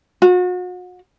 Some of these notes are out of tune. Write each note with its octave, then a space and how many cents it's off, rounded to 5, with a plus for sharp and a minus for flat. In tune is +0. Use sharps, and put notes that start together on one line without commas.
F#4 -40